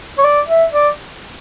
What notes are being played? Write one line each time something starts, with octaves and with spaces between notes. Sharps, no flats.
C#5
D5
E5
D5